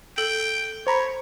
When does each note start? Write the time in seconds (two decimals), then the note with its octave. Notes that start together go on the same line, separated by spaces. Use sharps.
0.18 A4 G5
0.87 C5 C#5 A#5 B5